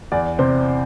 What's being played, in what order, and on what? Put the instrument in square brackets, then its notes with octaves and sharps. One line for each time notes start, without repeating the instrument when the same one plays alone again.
[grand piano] E2 D5
C3 C5